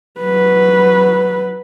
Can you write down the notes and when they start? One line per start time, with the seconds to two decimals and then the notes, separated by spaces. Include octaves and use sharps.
0.20 F#3 B4